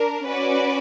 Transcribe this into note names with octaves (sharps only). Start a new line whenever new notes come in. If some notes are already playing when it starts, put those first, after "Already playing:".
Already playing: D4 A#4
C#4 F#4 B4 D5